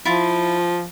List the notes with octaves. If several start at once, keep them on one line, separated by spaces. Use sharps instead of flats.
F3 E4 F4